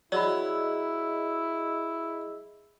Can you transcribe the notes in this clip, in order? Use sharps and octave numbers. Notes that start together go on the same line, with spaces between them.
F#3 E4 G#4 D5 D#5 B5 E6